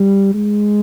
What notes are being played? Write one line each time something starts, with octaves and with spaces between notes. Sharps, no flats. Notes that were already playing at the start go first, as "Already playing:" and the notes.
Already playing: G3
G#3